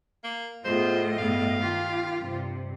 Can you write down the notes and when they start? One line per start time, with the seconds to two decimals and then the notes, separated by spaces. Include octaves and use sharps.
0.24 A#3
0.65 A2 B3 F4 G#4 C5 D#5
1.18 G2 B2 B3 F5
1.61 D#3 F4 G4
2.21 G2 C3